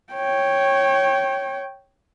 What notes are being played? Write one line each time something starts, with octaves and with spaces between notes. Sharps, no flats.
C#5 G5